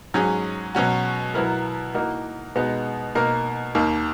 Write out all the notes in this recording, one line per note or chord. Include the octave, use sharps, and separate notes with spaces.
G#2 F#3 C#4 G#4
B2 F#3 C#4 F#4
B2 F#3 B3 E4 A#4
E3 A#3 D#4 F#4 A#4
B2 G#3 B3 D#4 F#4
B2 A#3 D#4 A#4
D#2 D#3 A#3